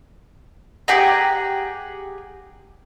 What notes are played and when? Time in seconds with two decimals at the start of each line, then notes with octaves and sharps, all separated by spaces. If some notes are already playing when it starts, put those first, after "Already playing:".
0.88 G4 G#4 F#5 A#5